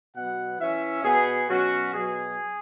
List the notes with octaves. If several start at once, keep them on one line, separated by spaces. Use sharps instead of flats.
B2 F#3 B3 F#5
E3 C#4 E5
B2 B3 G#4
B2 F#3 C#4 F#4
B2 F#3 B3 G#4